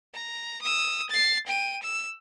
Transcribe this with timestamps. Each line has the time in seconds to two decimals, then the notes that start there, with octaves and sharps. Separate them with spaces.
0.14 A#5
0.62 D#6 E6
1.10 A6 C7
1.46 G5 D#7
1.83 E6